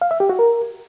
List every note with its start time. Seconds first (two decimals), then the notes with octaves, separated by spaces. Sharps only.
0.02 F5
0.11 E5
0.20 G4
0.30 F#4
0.39 A#4